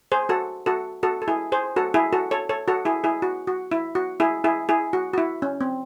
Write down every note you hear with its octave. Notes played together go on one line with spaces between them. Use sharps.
G#4 C5
F#4 A4
F#4 A4
F#4 A4
A4
E4 G#4
G#4 C5
F#4 A4
E4 G#4
F#4 A4
A4 C#5
A4 C#5
F#4 A4
E4 G#4
E4 G#4
F#4
F#4
E4
F#4
E4 G#4
E4 G#4
E4 G#4
F#4
F#4
E4
C#4
C4